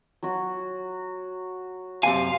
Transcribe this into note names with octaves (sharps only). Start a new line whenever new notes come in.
F#3 F#4
F#2 C3 F5 G#5